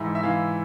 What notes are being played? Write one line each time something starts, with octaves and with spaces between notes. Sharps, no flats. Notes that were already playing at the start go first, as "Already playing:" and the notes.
Already playing: G#2 E3 E5
E5
E3 F5